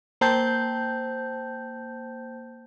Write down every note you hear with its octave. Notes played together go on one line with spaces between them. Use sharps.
A#3 C5 G5 A5 G6